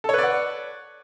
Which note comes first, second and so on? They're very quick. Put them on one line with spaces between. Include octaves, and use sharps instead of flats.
A4 C#5 B4 D5 F#5